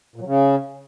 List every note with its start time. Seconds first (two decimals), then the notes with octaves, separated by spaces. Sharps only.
0.16 A#2
0.21 F#3
0.26 C#3